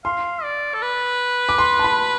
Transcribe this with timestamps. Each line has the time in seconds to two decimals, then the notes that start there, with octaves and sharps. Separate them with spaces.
0.04 F5 C6
0.43 D5
0.74 A4
0.82 B4
1.49 D6
1.58 C6
1.79 A5
1.84 B5